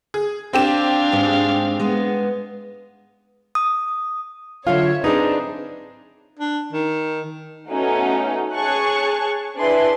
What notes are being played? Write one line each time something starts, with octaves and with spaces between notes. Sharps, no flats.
G#4
C4 D4 G4 F5 E7
G#2 G#3
G#3 B3
D#6
D3 F#3 F4 C#5 E5 F5
C4 D4 D#4 G#4 B4
D4
D#3
A3 B3 C#4 D#4 F#4
G#4 C#5 A5 C#6 F#6
D4 E4 G#4 B4 D5 C6